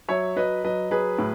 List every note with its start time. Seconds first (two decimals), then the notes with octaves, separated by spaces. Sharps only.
0.08 F#3 C#5 E5
0.36 F#3 B4 D#5
0.64 F#3 B4 D#5
0.91 F#3 G#4 B4
1.19 A2